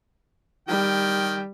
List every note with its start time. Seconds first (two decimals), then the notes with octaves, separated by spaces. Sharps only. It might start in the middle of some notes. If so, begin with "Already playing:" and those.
0.68 D#3 G3 G5